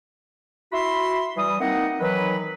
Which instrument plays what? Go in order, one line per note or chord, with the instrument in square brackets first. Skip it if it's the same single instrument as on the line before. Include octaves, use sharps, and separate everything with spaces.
[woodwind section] E4 F#4 E5 B5 C6
E3 G3 D#6
A#3 C4 D#4 D#5 F#5
D#3 E3 F#3 B4